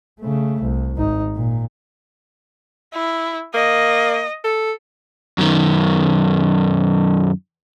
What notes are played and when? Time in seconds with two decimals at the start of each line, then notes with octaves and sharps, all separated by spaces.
0.21 C#3 A3
0.62 C2
0.96 G#1 D#4
1.36 A#2
2.93 E4
3.54 A#3 D#5
4.44 A4
5.38 F#2 D#3